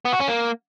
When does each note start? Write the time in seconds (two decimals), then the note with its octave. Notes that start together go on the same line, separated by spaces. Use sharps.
0.05 B3
0.13 F#4
0.20 C#4
0.28 A#3